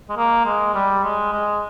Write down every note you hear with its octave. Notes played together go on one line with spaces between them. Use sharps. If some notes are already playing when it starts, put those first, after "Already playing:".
G#3
A#3
G#3
G3
G#3
G#3